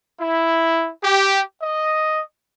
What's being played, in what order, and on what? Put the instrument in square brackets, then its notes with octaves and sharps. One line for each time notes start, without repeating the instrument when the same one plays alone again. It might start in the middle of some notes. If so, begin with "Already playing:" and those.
[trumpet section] E4
G4
D#5